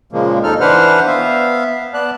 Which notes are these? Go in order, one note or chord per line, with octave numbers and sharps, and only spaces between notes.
A#2 C#3 F3 G#3 A#3
D#2 D#4 A4 F6
E3 D4 B4 C5 F#5 F6
B3 E5 F5
B3 D5 A5 F#6